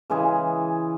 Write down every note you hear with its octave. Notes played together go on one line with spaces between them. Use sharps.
C#3 E3 G#3 G#4